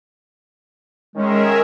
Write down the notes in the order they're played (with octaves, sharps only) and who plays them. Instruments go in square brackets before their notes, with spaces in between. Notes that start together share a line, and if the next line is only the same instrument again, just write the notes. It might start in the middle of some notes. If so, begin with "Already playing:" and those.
[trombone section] D#3 C#4 [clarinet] G#3 [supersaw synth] G#4 A#4 E5